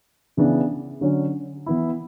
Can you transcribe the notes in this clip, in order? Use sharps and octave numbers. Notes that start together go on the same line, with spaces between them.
C#3 E3 B3 D4
D3 F#3 C#4
E3 B3 E4